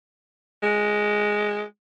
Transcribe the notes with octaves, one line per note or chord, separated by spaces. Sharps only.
G#3